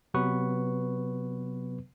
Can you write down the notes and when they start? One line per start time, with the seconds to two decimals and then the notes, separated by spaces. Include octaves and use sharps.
0.14 C3 F#3 B3 B4 C#6